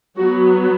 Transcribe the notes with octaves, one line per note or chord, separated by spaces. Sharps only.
F#3 B3 F#4